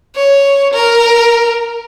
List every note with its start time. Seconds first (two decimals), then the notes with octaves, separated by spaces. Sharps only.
0.16 C#5
0.73 A#4